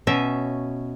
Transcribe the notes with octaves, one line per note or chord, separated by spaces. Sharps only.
B2 C#4 E5